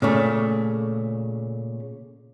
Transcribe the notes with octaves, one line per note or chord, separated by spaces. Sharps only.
A#2 C#3 A3